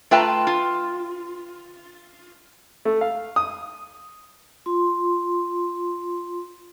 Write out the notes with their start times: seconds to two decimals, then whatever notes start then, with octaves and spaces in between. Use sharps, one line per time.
0.11 A3 F4 B4 G5 A5 A#5
0.47 F4
2.85 A3
3.01 F5
3.36 D#6
4.66 F4 C6